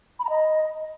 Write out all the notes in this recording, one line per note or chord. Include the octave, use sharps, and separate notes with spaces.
B5
A#5
D#5